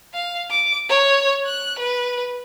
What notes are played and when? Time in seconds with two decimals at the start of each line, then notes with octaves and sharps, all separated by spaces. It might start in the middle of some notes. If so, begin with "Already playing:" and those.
0.14 F5
0.50 D6
0.90 C#5
1.46 F#6
1.79 B4